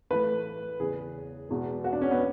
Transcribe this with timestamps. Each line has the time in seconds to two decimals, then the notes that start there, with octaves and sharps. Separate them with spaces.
0.10 A2 E3 A3 B4
0.80 E2 C#3 E3 G#4
1.49 E2 B2 G#3
1.84 F#4
1.93 D4
2.02 C#4
2.11 B3